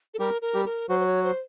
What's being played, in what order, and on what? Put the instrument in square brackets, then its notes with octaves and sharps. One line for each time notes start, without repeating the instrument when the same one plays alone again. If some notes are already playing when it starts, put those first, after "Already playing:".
[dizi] A4
[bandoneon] G3 G4 [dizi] A#4
[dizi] A#4
[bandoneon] G3 G4
[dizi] A#4
[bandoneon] F#3 F#4 [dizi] C5
[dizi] C5
C#5
C5